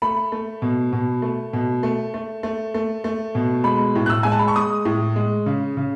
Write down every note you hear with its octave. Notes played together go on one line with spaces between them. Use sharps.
A3 B5
A3
B2
B2
A3
B2
A3
A3
A3
A3
A3
B2
G#3 B5
A2
F#6
E6
G#3 G#5
A5
B5
C#6
G#3 D#6
A2
G#3
C#3
C#3